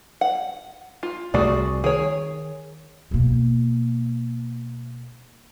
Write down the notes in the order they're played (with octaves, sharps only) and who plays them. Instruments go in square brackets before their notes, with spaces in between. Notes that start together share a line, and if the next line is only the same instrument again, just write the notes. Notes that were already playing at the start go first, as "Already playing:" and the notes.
[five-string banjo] F#5
F4
[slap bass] C2 C3 A3 [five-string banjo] F#4 G#4 D5
[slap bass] D#3 [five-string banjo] G#4 C#5
[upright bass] B2 A#3